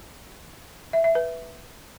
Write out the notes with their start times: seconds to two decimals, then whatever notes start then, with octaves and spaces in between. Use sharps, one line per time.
0.93 E5
1.04 E5
1.15 B4